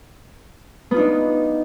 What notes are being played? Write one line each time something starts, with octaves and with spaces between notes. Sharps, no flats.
B3 D4 D#4 F4